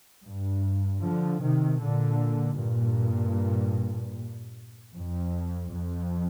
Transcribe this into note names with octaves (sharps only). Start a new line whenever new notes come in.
G2
D3 F3
C3 D#3
A#2 D3
G2 A#2
F2
F2